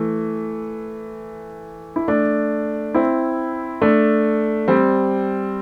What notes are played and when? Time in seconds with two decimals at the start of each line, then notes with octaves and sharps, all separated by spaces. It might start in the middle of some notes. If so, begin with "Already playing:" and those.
Already playing: E3 A3
1.96 E4
2.08 A3 D4
2.94 C4 E4
3.82 A3 D4
4.68 G3 C4